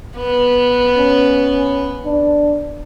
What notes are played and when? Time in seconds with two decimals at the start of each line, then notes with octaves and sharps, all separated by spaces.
0.18 B3
0.98 C#4
2.05 D4